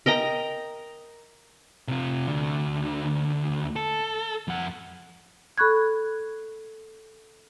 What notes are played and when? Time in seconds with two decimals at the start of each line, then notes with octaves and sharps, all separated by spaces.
0.06 A#4 D#5 G5 A#5
1.88 C3 F4
2.28 D2 D3
3.76 A4
4.48 F2 F#5
5.58 A4 B5 C#6 F#6 G#6